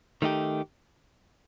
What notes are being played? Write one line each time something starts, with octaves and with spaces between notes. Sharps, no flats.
D#3 A3 D#4 G4